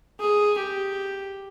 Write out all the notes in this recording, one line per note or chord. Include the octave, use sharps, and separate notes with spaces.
G#4
G4